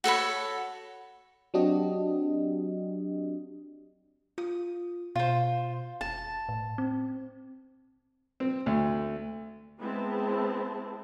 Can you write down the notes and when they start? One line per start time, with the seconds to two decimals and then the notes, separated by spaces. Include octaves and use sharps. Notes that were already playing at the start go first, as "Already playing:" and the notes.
0.04 F#4 A4 C#5 B5
1.54 F#3 C4 D4 F#4 G4 D#5
4.38 F4 D#6
5.16 B2 F4 C5
6.01 F1 A5
6.49 A2
6.78 C4
8.40 C4
8.66 D2
9.78 G#3 B3 C4 E4 A5